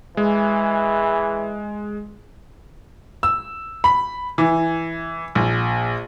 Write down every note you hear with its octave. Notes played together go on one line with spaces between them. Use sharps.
E3 G#3
E6
B5
E3
A#1